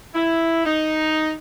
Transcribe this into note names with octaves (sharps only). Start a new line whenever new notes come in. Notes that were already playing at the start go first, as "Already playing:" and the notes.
E4
D#4